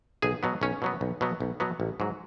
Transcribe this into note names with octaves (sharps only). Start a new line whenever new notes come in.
B1 G#4
B2 F#3 B3
B1 C#4
B2 F#3 B3
B1
B2 F#3 B3
B1
B2 F#3 B3
A1
G#2 F#3